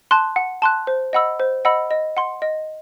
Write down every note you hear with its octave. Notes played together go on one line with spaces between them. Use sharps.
A5 C6 F#6
F#5
A5 C6 F#6
C5
D#5 F#5 B5 E6
C5
D#5 F#5 B5 E6
D#5
F#5 C6
D#5